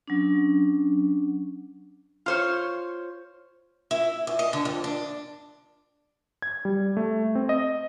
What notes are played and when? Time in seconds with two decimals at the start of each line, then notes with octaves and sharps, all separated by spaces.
0.07 F#3 C#4 D4
2.26 F4 C5 C#5
3.91 E4
4.27 D2
4.39 D#5
4.53 D3
4.65 F2
4.84 D4
6.42 G#6
6.65 G3
6.97 A3
7.35 C4
7.49 D#5